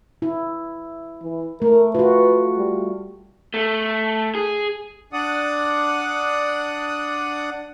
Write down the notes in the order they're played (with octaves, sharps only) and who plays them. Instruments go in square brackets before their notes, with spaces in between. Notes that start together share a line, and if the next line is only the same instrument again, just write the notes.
[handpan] E4
[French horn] E3
[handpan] A3 [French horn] A#4
[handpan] F4 F#4 [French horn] B4
[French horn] G3
[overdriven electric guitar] A3
G#4
[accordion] D4 D5 F#5 D#6